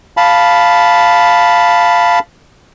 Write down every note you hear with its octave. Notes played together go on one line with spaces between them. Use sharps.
F5 A5 B5